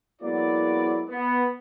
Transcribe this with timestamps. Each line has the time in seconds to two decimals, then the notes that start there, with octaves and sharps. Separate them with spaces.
0.22 F#3 G#3 A#3 B3 E4 D5
1.09 B3